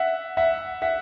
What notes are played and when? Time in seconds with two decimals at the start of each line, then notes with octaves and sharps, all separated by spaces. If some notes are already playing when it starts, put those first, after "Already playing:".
Already playing: E5 F#5
0.37 E5 F#5
0.82 E5 F#5